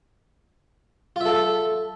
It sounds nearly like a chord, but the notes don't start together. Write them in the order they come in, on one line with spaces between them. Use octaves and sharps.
F4 E5 A4